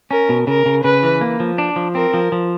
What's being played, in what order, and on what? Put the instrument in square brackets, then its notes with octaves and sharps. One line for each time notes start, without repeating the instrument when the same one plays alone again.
[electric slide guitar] C#4 [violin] A#4
[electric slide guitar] B2
[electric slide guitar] C#3 [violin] A#4
[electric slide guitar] C#3
[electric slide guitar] C#3 [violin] B4
[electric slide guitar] E3
A#3
F3
D4
F3
[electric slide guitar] C4 [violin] A#4
[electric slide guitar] F3
F3